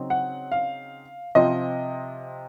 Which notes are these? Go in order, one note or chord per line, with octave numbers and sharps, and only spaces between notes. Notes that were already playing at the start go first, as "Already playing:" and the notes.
Already playing: C#3 F#3 C4 D#4
F#5
F5
C3 F3 C4 F4 D#5